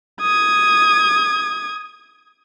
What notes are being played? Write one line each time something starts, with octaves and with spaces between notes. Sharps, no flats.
D#6 G#6